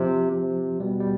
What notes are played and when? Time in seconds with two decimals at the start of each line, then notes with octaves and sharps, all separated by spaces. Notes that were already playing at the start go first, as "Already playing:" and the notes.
Already playing: C3 F3
0.31 C3
0.80 B2 G3
1.00 G3